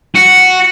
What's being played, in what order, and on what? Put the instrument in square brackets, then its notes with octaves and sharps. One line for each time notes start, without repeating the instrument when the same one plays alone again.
[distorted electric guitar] F#4